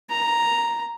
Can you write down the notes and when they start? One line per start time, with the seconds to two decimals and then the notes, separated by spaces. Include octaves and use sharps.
0.10 A#5